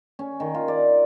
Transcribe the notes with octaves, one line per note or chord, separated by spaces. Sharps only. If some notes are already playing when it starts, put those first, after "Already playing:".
C#4
D#3
F4
D5